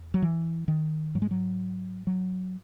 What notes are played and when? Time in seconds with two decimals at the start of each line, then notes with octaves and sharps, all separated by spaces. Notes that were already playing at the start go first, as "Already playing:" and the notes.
Already playing: E2
0.14 F#3
0.22 E3
0.68 D#3
1.15 G#2 F#3
1.22 G#3
1.31 F#3
2.07 F#3